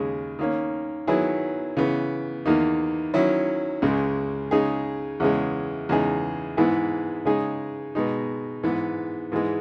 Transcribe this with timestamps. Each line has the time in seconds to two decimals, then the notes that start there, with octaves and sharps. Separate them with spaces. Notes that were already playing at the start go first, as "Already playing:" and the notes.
Already playing: D#2 C#3 G#3
0.39 D#3 A#3 C#4
1.07 D#3 F#3 B3 E4 G#4
1.77 C#3 E3 B3
2.46 E2 D#3 A#3 D#4
3.14 D#3 F#3 C#4 E4
3.82 C#2 C#3 G#3
4.51 C#3 G#3 D#4 G#4
5.20 E2 C#3 G#3
5.89 E2 C#3 G#3 D#4 G#4
6.57 G#2 E3 B3 E4 G#4
7.25 C#3 G#3 D#4 G#4
7.95 B2 G#3 D#4
8.63 G#2 E3 B3
9.32 G#2 E3 G#3